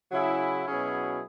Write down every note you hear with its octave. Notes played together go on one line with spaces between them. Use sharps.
C#3 F#3 E4 G#4
B2 F#3 C#4 E4 G#4